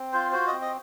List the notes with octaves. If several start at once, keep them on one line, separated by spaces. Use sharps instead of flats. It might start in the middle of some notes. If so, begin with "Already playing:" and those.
Already playing: C4
F4 C5
F#4 C5
D#5
C4
D#5